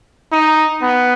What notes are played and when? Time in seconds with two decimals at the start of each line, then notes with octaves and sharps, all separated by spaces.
0.32 D#4
0.82 B3